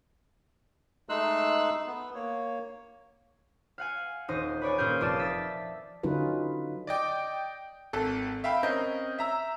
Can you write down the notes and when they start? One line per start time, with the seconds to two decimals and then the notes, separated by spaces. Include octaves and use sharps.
1.09 G#3 A3 D#4 C6 E6 F#6
1.87 B3
2.15 A#3 C#5
3.78 F5 F#5 G#5
4.28 D#1 D#4 C5 D#5
4.61 B4 C#5 D5 G#5
4.78 A#2 C#4 G#4 F5 G6
5.01 F1 F4 D5 A5 D#6 E7
5.19 E5 A6 B6
6.03 D3 F#3 C#4 D#4 F4 B4
6.87 D5 D#5 G5 D6
7.93 G#1 A4
8.44 E5 F5 G5 B5
8.63 C4 C#4 A#4 D#5 G6
9.18 E5 A#5 E6